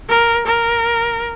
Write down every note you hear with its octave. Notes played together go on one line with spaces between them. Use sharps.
A#4
A#4